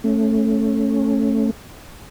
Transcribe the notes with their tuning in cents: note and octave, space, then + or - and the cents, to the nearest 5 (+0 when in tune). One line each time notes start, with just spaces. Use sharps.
A3 +0 C#4 -15